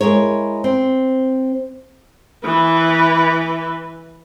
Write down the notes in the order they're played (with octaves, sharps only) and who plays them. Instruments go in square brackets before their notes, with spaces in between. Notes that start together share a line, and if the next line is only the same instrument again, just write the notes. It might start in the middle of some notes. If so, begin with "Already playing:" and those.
[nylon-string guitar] G#3 E4 A#4 C#5
C4
[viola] E3 B4